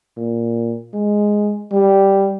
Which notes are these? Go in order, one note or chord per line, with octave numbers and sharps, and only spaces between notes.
A#2
G#3
G3